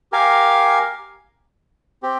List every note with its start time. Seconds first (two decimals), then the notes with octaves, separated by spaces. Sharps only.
0.12 G4 A#4 F5 G#5
2.03 C4 G4